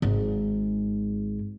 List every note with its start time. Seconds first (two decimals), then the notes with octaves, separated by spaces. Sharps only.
0.02 G#1 G#2